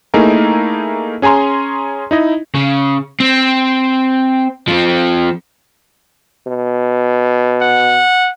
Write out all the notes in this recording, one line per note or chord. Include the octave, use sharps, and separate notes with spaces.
A3 A#3 D#4 E4 G#4 A#4
C#4 G#4 G#5 A#5 C6
D#4 E4 D#5
C#3
C4
F3 C4
B2
F#5